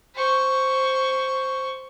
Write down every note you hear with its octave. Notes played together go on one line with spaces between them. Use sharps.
C5 C#6